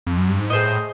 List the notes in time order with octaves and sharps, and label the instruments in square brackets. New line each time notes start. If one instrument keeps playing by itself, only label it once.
[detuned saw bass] F2
F#2
G2
G#2
[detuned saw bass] A2 [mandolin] G#4 C5 D#5